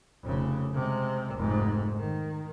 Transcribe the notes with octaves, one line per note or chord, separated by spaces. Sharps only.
F1 C#3
C3 G#3
F1 G#2
D#3